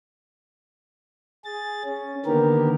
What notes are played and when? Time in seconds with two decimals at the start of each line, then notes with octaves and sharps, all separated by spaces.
1.45 G#4 A6
1.84 C#4
2.26 D3 D#3 A#3 B3 G4 A#4